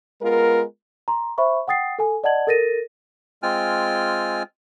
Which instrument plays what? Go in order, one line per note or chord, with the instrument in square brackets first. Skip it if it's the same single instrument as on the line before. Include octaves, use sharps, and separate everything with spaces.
[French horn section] G#3 B3 F4 A#4
[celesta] A#5 C6
C5 E5 B5 C#6
F#5 G5 D#6 A6 C7
A4 G#5
D5 D#5 F#5 A5 G#6 F#7
A4 A#4 A6 A#6 D#7
[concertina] G#3 C4 F4 G5 G#5 F6